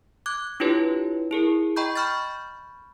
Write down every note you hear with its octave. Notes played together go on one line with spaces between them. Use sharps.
D6 F#6 G#6
D4 E4 F4 G4 B4 C#5
E4 G#4 A#4
D#5 G5 A#5 B5 C#6 G6
B5 C#6 F6 G6 A6